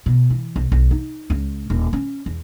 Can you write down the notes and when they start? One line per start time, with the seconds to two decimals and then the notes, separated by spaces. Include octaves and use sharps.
0.06 B2
0.30 E3
0.56 B1
0.72 B1
0.91 D#4
1.30 C#2
1.70 D#1
1.93 C#4
2.26 E2